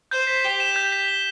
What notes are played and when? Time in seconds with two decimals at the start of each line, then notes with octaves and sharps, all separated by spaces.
0.11 C5 G6
0.27 B6
0.44 G4 G7
0.60 E7
0.76 G6
0.92 B6
1.08 G7